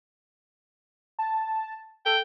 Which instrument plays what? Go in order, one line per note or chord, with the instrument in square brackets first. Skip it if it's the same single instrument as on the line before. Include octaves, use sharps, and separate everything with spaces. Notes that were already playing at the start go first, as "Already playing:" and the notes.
[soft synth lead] A5
[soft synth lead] A4 [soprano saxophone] G5